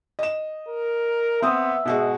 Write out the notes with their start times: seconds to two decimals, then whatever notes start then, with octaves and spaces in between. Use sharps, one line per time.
0.19 D#5 E7
0.68 A#4
1.42 B3 C4 E5 D#6
1.85 G#2 B2 F#4 G#4